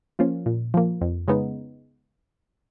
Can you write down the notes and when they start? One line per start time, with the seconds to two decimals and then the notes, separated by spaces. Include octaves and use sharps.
0.19 F3 A#3 C#4 F4
0.46 A#2
0.74 F3 A#3
1.01 F2
1.28 C#3 G#3 B3 D#4